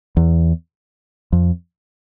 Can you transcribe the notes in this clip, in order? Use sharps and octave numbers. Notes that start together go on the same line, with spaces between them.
E2
F2